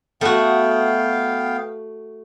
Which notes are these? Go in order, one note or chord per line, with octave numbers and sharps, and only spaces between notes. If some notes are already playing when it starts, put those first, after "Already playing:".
A3 B3 F#4 F5 G5